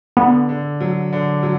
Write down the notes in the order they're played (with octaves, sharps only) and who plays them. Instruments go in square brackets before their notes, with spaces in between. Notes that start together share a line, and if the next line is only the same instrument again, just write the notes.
[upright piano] D3 [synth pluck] B3
[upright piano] D3
F#3
D3
F#3